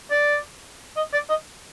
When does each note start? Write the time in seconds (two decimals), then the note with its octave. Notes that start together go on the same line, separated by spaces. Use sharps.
0.11 D5
0.97 D#5
1.13 D5
1.29 D#5